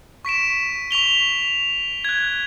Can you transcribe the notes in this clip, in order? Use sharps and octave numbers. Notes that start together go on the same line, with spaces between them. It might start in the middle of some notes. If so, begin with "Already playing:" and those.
C#6 B6 D7 E7
C#6 B6 F7 G7
F#6 G#6